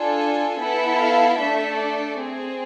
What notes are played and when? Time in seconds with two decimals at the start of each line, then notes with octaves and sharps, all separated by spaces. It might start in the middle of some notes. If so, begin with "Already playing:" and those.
Already playing: D4 F4 A4 G#5
0.60 B3 E4 A4
1.00 F5
1.38 A3 D4 A4 E5
1.77 D5
2.17 C4 G#4